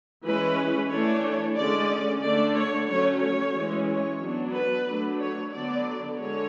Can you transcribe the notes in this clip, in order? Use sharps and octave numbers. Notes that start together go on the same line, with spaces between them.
E3 G#3 C#4 B4
E3 A3 D4 C#5
D3 G#3 C#4 D5
D3 A3 D4 D5
C#5
F#3 A3 C#4 C#5
C#5
E3 G#3 C#4
C#5
F#3 B3 D4
B4
F#3 A3 D4
C#5
D3 F#3 B3 D4 D5
D3 G#3 C#5